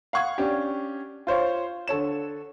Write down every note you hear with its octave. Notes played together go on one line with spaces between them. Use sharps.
F5 F#5 C#6 G#6
C#4 D4 G4
F4 C5 C#5 F5
D3 A4 C#5 E7